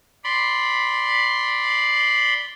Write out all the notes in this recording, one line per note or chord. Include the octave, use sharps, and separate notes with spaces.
D5 B5 C6